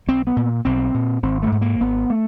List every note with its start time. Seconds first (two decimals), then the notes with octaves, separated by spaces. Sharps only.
0.07 B1 C4
0.27 B3
0.36 A#2
0.65 B1 C4
0.94 A#2
1.22 G#1 C4
1.42 A3
1.52 G#2
1.61 A#3
1.81 G#1 B3
2.10 A3